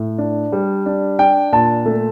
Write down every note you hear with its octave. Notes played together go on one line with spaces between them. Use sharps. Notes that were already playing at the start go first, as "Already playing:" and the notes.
Already playing: A2
D4
G3
D4
D4 G5
A#2 A5
A3